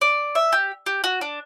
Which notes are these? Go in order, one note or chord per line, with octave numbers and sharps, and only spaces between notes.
D5
E5
G4
G4
F#4
D4